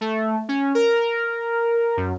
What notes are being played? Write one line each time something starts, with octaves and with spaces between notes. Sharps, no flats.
A3
C#4
A#4
F#2